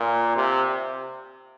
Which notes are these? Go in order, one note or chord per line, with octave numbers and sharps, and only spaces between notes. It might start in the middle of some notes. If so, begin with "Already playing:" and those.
Already playing: A#2
C3